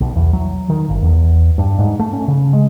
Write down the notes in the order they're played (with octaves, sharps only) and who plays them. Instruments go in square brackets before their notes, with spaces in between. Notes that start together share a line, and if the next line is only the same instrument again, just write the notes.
[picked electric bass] B1
E2
F#3
D#3
G1
E2
G2
G#2
A3
C#4
C#3
G#3